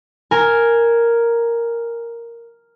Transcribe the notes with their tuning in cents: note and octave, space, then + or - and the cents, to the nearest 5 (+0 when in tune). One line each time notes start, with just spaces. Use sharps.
A#4 +0 G#5 +0